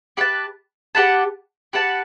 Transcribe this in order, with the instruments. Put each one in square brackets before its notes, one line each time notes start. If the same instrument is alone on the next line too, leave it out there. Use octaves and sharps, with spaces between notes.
[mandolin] G4 B4 F#5 A5
G4 B4 F#5 A5
G4 B4 F#5 A5